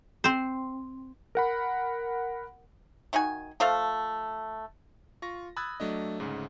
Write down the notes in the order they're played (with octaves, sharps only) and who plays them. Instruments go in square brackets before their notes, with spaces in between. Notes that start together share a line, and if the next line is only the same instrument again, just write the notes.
[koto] C4 C5
[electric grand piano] A#4 F#5 B5
[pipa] D#3 D#4 F#4 G#5
F3 A3 A4 F5
[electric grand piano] F4 C#6 A#6
B5 D#6 E6 F#6 G#6 A6
F#3 A3 D4 D#5
D2 G#2 C#3